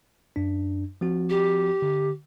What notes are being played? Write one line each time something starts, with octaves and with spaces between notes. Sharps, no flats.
F#2 D4
F3 C4 F#4
G4
D3